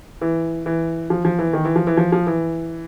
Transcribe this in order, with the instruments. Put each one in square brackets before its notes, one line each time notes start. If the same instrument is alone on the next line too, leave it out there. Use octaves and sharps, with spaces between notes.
[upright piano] E3
E3
F3
F3
E3
D#3
E3
F3
E3
F3
F3
E3